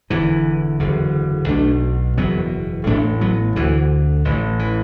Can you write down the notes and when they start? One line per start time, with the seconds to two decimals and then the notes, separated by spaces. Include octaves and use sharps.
0.10 E1 E2 D3 E3
0.80 F#1 E2 D3
1.48 B1 B2 A3 D4
2.17 F#1 E2 B2 F#3 B3
2.87 A1 A2 A3 D4
3.21 F#3 B3
3.56 D2 D3 E3
4.25 A1 A2 E3
4.59 E3